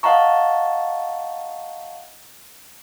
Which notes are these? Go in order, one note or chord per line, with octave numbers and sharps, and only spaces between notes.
D#5 F5 F#5 A5 A#5 C#6